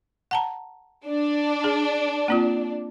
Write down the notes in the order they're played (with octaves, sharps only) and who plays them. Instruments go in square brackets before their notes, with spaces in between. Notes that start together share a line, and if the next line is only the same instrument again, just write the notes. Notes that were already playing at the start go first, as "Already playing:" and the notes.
[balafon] F#5 A5 A#5
[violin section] D4
[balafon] G#4
A#3 C4 F4